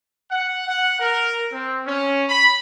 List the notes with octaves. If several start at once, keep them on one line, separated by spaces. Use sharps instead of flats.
F#5
F#5
A#4
C4
C#4
B5